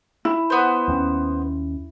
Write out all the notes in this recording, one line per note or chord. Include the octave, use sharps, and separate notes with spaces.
E4
B3 C5
D#2 A#3 C#4